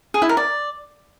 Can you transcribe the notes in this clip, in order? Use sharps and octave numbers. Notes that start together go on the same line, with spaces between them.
G#4
E4
A#4
D5